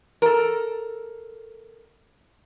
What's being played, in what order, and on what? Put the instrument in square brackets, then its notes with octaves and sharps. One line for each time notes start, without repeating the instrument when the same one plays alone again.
[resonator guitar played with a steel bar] A4 A#4